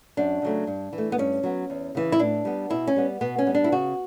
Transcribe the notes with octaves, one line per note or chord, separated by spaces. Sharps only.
F#2 D4
C#3 F#3 A3
G2
E3
A3
B3
G2 C#4
F#3 B3
E2
C#3 E3
E4
A2 D4
G3 B3
B2 E4
C#4
G3 B3
B2 B3
C#4
G3 B3
D4
E4
C#3 F#4